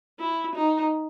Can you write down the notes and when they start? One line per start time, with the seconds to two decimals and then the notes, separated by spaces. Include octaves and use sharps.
0.20 E4
0.56 D#4